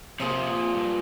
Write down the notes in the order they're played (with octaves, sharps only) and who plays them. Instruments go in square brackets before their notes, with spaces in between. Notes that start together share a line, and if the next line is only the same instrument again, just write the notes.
[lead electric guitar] C3 [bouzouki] F3 A#3 F4 G#4
[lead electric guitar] A#2
G2